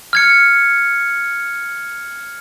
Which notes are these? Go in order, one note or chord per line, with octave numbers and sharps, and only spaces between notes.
F6 G#6 C#7